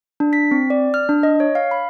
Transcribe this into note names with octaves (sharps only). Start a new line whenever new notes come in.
D4
B6
C4
D5
F6
D4
D#5
C#5
F5
B5